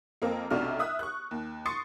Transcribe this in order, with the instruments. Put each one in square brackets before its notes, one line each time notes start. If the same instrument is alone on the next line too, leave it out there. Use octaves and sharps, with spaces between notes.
[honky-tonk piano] F2 A#3 C4
B1 C3 A3 D4 F#4 F6
E5 D#6 F#6
C#6 F#6
D#2
C6 C#6 D#6 A6 C7 C#7